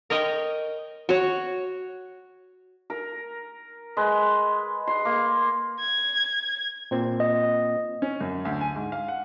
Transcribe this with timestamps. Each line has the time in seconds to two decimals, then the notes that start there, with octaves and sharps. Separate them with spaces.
0.10 A#4 C#5 D#5 G5
1.09 F#4 C#5
2.90 A#4
3.97 G#3 B4
4.87 C6
5.05 A#3
5.80 G#6
6.91 A#2 C4
7.20 D#5
8.02 C#4
8.21 F#2
8.45 D2
8.61 G#5
8.75 G#2
8.92 F5
9.08 F#5